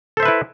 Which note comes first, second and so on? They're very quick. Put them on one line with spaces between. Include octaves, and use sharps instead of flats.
A4 C5 E5 B4 E4